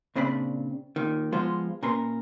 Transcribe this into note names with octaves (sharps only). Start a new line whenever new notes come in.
A#2 C#3 C4 D4 C5 B5
D#2 A#2 D#3
F3 G#3 B3 F4 C5
A#2 C#4 A#4 B4 C6